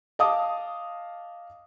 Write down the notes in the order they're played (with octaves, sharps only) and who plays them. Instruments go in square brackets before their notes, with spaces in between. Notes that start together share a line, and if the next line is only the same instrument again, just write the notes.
[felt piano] D#5 F5 A5 D6 D#6